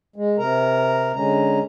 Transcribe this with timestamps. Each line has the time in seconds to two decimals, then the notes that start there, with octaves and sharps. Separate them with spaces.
0.16 G#3
0.39 C3 A#4 A#5
1.15 D3 G#3 C#4 A#5